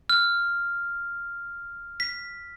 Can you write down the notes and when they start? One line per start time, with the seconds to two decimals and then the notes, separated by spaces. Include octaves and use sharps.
0.10 F6
2.00 B6